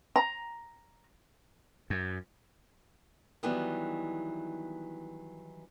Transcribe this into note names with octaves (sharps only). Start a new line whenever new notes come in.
A#5
F#2
D#3 E3 F#3 G3 B3